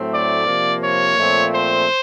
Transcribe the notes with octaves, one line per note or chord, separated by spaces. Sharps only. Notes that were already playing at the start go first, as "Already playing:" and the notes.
Already playing: A2 F#3 A3 C4
D5
C3 F3 A#3
C#5
A#2 F3 A3 C4
C5